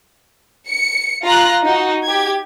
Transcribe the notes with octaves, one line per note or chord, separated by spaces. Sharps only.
C#7
F4 A#5 F#6
D#4 F#4
G4 G#6